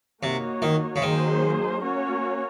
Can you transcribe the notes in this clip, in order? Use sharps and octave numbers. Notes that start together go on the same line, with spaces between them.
C3 A#3 D#4 F#4 C#5
D#3
C#3
D#3 F#3 A#3 D#4 G#4 C5
A#3 C#4 F#4 C#5